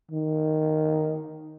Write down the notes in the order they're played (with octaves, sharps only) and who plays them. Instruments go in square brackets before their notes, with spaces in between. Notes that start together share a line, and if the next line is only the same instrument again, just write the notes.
[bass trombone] D#3